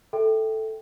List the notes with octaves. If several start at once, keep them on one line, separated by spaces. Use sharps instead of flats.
A4 E5 G5